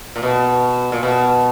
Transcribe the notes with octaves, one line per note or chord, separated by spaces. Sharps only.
A#2
B2
A#2
B2